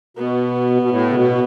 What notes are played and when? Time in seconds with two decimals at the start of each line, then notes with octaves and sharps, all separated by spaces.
0.17 B2 B3
0.82 B2
0.90 A2
1.09 C#3
1.14 B2